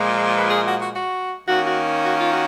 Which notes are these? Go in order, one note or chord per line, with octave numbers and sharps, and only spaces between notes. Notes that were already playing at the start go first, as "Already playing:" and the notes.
Already playing: A#2 F3 G#3
B4
G#4
F#4
F#4
F#4
D#3 A#3 C#4 F#4
F#4
F#4
F4
F#4